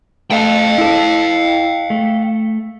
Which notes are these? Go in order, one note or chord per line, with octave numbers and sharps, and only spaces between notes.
A3 A4 F5 G5
E4 A4
A3